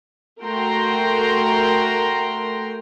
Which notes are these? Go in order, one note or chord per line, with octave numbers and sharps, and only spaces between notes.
A3 F#4 A#4 G5 A#5 C6